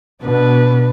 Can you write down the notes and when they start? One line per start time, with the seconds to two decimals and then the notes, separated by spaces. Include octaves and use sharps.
0.24 B2 D4 B4